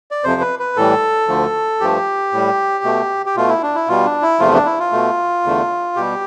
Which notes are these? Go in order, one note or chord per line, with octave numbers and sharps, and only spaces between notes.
D5
F2 C3 F3 C5
B4
B4
A2 E3 G3 A4
D2 D3 F3 A3
G2 F3 A3 G4
A2 G3
B2 A3
G4
B2 A3 F4
E4
D4
E4
B2 G3 F4
D4
E4
E2 C3 F3 A3 F4
D4
E4
F4
B2 A3
E2 D3 A3
B2 G3 G4